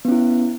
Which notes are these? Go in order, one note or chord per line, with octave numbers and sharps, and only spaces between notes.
B3 C#4 E4